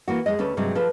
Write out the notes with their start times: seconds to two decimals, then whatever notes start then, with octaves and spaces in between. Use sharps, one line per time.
0.08 E3 A#3 F#4
0.26 F2 G#3 G#4 D#5
0.39 D2 C#4 A4 B4
0.57 G2 C3 F#3 G#3 C4
0.75 F3 A4 B4